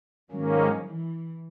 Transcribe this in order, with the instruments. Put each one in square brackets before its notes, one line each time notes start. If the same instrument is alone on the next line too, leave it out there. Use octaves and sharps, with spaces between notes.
[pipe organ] G#2 D#3 A#3 C#4 [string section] F#3
[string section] E3